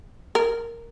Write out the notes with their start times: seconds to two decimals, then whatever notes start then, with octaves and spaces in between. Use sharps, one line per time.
0.35 A#4